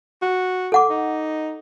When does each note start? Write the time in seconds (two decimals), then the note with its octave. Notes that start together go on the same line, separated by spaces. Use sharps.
0.22 F#4
0.72 A4 F#5 D6
0.90 D#4